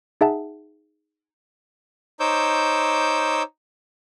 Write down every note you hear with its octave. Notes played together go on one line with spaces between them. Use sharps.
D#4 G#4 E5 F#5 A5
D#4 C5 C#5 D6 E6 G6